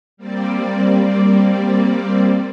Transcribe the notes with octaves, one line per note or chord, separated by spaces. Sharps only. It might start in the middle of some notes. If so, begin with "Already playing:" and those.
G3 A#3 C4 D5